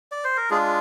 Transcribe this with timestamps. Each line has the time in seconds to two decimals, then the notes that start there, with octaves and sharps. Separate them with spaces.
0.12 D5
0.25 C5
0.37 A#4
0.50 G#3 D4 F4 G#4